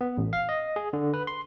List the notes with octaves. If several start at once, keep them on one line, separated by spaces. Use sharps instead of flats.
B3
A1
F5
D#5
G#4
D3
B4
C6